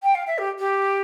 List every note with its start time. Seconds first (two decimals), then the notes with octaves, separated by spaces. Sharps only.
0.03 G5
0.15 F5
0.27 E5
0.38 G4
0.59 G4